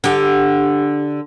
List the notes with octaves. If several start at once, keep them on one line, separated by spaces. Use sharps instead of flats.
D3 G4